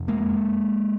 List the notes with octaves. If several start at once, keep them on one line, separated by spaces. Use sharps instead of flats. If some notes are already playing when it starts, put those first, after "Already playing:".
Already playing: F2 C3
G#3 A#3